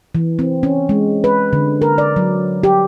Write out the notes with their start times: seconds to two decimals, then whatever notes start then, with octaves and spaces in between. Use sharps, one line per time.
0.15 E3
0.39 C4
0.63 C#4
0.89 G#3
1.24 B4
1.53 D3
1.82 A#4
1.98 D5
2.16 F#3
2.63 G4